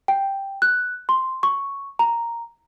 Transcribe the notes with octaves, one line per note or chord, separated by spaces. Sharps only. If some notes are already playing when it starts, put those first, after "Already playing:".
G5
F#6
C6
C#6
A#5